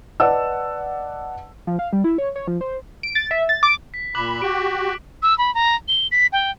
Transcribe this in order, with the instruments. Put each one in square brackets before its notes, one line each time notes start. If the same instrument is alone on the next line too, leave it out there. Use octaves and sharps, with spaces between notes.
[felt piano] B4 D5 D#5 F#5 A5 E6
[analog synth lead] F3
F5
G3
E4
C#5
C#5
F3
C5
[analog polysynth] D7
A6
E5
A6
D6
[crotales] B6
[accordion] A#2 B5 [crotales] D6 F#6 F#7
[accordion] F#4 G4 [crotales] D7
[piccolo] E6
B5
A#5
G7
B6
G5